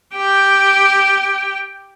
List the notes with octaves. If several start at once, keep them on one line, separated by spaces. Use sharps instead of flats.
G4 G5